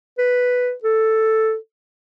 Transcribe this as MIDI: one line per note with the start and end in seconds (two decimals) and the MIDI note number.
0.18 0.73 71
0.83 1.56 69